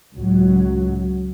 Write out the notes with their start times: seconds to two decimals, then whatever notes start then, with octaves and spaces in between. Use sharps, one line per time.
0.14 C#2 A2 F#3